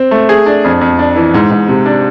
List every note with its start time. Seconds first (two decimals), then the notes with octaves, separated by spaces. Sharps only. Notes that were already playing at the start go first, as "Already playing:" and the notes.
Already playing: C4
0.11 A3
0.29 G#4
0.46 D4
0.64 F2
0.81 F2
0.99 D4
1.16 E3
1.34 G#2
1.51 G#2
1.68 C3
1.86 D4